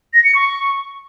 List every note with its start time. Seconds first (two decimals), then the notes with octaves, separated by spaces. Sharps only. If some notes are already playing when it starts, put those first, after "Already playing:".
0.14 A#6
0.24 C#7
0.35 C#6